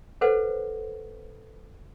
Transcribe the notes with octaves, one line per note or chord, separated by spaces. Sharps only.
A4 B4 C5 F#5